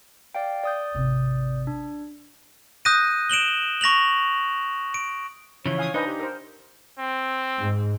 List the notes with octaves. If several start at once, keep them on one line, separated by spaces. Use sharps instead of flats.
D5 F5 G5
D5 D#6 G6
G#1 C3
D4
D#6 F#6 G6 A#6 D#7
D7 E7 F#7 G7
C#6 A#6 F7 F#7
D7
C#3 E3 F3 C#5
F5 G#5 D#6
D4 D#4 B4 C5 D#5
G4
A#4 C5
C4
G#2